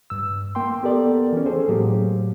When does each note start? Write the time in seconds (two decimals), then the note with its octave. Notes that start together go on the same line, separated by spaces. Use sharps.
0.10 G2 E6
0.55 A#3 G5 C6
0.83 B3 G4 A4 A#4 D5
1.33 E3 C#4
1.46 G#4 A4 C5
1.68 A2 F#3 A#3 G4